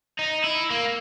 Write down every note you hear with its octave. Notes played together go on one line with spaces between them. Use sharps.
D#4
E4
A#3